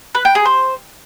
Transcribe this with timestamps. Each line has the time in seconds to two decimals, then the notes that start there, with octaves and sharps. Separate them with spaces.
0.15 B4
0.25 G5
0.35 G#4
0.45 C5